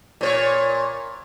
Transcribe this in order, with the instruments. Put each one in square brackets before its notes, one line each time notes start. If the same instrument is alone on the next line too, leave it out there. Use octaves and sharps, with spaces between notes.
[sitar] A#2 C5 C#5